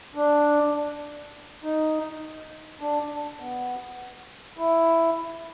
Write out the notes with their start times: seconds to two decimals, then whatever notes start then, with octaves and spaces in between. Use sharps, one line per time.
0.15 D4
1.63 D#4
2.81 D4
3.40 B3
4.57 E4